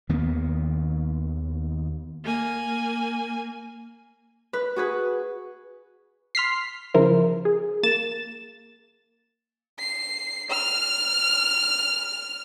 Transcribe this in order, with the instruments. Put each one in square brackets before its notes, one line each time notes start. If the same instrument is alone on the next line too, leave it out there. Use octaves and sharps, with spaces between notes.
[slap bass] D#2 D#3 A#3 B3
[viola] A#3 G#5
[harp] B4
F#4 G#4 B4
[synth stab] C6 F6 B6 C7
C#3 F3 E4 A#4 C5
G#4
A#3 A6 E7
[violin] C7
F6